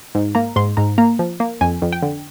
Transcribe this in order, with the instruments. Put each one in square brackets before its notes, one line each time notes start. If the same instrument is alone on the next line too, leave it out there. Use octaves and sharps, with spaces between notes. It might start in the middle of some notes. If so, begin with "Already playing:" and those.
[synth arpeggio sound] G#2
A#3 A#5
G#2 C6
G#2 A#5
A#3 A#5
F3
A#3
F2 G#5
F2
G5
D3